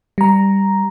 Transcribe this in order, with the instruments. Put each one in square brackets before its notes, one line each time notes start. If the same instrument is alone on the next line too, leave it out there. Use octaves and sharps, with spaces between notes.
[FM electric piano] G3 A#5